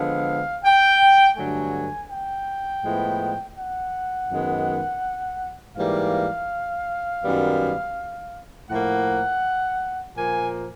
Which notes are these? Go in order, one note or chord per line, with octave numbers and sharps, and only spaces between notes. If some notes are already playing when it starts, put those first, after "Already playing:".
Already playing: D3 F3 G#3 B3 F5
G5
G2 D3 F#3 A3 G#5
G5
A2 F3 G#3 B3
F#5
F#2 D#3 G#3 B3
G#2 E3 G3 A#3 F5
F#2 D#3 G3 B3
A2 F3 A#3 F#5
A#2 F3 A#3 G#5